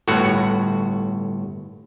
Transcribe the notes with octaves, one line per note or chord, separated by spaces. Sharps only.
G1 A2 F#4 F#5